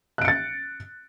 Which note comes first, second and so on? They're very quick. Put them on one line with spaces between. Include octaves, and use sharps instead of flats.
F#6 D7 C#7 A6